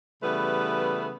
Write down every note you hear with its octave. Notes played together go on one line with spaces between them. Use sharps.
C#3 E3 G3 A3 B3 B4